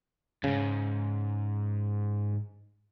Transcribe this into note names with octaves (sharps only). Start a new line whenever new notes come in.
D#2 G#2 C#3